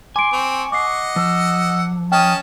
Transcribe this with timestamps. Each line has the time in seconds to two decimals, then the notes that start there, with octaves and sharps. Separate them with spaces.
0.16 G#5 C6 D6 D7
0.32 C4 C#6
0.72 D#5 F#5 D6 C7
1.16 F3 E6
2.12 C#4 D#5 G5 A5 F6